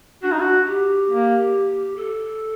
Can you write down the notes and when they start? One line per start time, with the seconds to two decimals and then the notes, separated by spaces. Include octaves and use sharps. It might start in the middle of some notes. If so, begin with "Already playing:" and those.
0.23 D4 F#4
0.32 D#4
0.38 D4 F#4
0.67 G4
1.10 A#3
1.96 A4